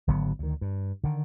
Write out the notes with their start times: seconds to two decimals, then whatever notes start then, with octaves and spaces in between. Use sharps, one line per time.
0.07 G#1 D3 F#3 B3
0.39 D2 D#3
0.61 G2
1.04 D3 D#3